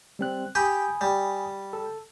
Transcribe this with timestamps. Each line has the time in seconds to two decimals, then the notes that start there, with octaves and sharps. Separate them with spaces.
0.19 G3 C4 F#6
0.55 G4 G5 G#5 B5 D#6
1.01 G3
1.73 A4